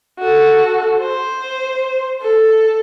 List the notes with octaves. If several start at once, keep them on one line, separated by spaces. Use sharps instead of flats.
F#4 A4
C5
A4